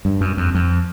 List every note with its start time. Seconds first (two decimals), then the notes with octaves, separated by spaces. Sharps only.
0.05 G2
0.21 F#2
0.37 F2
0.55 F2